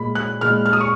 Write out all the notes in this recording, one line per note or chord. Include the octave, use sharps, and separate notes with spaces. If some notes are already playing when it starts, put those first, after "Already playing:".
Already playing: A#2 G#3 B5
F#6
A#2 G#3 F6
F6
D#6
C#6